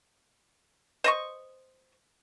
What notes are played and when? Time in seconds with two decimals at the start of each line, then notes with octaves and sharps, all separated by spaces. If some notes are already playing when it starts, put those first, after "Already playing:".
1.04 C5 D#5 C#6